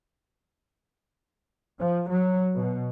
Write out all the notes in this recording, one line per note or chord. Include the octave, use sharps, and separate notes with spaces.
F3
F#3
B2